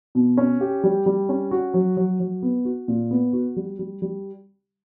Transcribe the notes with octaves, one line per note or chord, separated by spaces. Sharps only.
B2
C#4
G4
G3
G3
C#4
F#4
F#3
F#3
F#3
B3
F#4
A#2
B3
F#4
G3
G3
G3